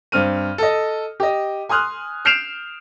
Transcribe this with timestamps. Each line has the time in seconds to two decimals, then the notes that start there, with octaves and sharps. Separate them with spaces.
0.12 G2 C4 F6 D#7
0.58 A4 D#5
1.20 G4 D#5
1.69 G#5 C6 D#6 F6 F#6
2.25 F6 G6 C7 D7 E7 F7